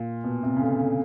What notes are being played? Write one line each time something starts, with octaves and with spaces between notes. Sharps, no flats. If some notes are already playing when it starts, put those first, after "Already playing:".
Already playing: A#2
B2
C3
C#3
D3
D3